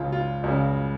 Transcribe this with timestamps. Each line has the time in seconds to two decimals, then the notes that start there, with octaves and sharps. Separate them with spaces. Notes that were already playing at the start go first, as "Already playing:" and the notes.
Already playing: C#2 C#3 F4
0.12 F4
0.44 C#2 C#3